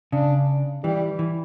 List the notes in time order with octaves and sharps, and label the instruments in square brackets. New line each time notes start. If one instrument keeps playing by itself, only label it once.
[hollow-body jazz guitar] C#3 [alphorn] D4
[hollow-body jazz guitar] E3 [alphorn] G3
[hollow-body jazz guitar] E3